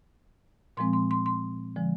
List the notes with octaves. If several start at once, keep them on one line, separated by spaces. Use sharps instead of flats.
A#2 F3 G#3 C4 C6
C6
C6
C6
D3 F3 G#3